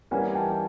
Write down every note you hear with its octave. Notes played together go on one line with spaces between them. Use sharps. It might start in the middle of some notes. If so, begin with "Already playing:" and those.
E3 G3 A#3 C#4 F#5 G#5
G5 A5